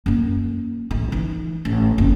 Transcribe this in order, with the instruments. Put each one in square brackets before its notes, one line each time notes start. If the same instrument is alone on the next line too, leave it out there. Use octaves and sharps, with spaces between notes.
[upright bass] F#2 A#3
A1 E4
E3 D#4
A1
F#1 F2